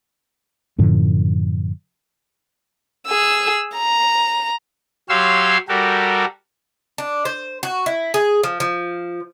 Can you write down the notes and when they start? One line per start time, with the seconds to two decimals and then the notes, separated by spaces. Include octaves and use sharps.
0.78 F#2 A2 D3 F3
3.07 G#4 E6
3.75 A#5
5.09 F#3 G4 C#5 F5 C6 E6
5.68 G3 F#4 G4 A4 A#4
6.98 D4
7.25 C5
7.63 F#4
7.86 E4
8.14 G#4
8.43 F3
8.60 F3